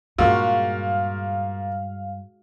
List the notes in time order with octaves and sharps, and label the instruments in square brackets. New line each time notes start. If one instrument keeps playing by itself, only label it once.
[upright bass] G2 [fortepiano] A#2 [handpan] G#3 F#4 [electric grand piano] F5